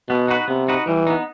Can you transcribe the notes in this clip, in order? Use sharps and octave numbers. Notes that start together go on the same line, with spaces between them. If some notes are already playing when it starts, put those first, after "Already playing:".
B2 B3
D#4 F#4 B4
C3 B3
D#4 F#4 B4
E3 G3
B3 D#4